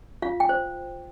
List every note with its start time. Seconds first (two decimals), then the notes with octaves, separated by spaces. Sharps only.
0.22 F4 F5
0.40 G5
0.49 C5